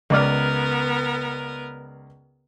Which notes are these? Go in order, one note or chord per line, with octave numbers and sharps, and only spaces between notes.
C#2 B3 A#4 D5 F6